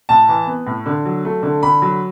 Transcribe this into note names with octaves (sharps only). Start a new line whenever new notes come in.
A2 A5
E3
B3
A2
D3
F#3
A3
D3
D3 B5
F#3